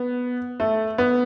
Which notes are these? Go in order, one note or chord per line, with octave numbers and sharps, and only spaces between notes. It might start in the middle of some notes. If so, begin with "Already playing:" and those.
Already playing: B3
A3
B3